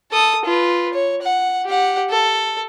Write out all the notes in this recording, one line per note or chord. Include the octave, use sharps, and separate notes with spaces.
A4 D#6
F4 B4
C#5
F#5
G4 F#5
A4